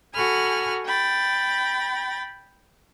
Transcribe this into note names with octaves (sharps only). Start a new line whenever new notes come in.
F#4 A4 G#5 B5 F6
G5 B5 A6